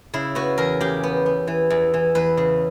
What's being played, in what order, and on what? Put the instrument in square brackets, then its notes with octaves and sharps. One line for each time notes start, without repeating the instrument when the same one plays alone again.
[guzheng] C#3 E4
B3 F#4
E2 A#4
C#3 G4
B3
B3
E3
E2
E3
E2 B4
C#3